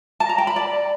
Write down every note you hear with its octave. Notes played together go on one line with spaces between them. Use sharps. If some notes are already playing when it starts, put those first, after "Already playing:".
A5
A#5
G5
B5
D5